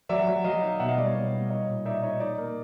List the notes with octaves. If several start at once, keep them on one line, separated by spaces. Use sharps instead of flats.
F#3 D5 E5
F#3
F#3 D#5 F5
D#4
B2 E5 F#5
D#5 F5
G3 D5
C#5
B2 D5
G3
D#4 C#5 D#5
A#2
D#4 D5 E5
D#4 C#5 D#5
D#4 D5
A#3